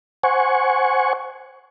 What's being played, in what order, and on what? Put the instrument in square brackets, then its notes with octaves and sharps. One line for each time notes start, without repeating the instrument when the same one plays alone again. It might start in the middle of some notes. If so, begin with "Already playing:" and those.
[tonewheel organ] C5 F#5 G#5 C#6